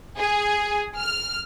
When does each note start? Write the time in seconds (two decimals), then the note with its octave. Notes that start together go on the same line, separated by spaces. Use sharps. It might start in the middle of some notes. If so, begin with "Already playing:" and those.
0.18 G#4
0.98 F6